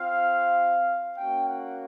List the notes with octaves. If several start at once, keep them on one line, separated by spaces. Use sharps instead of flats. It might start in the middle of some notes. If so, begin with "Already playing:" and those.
Already playing: C4 F4 F5
A#3 C#4 F#4 G5
F#5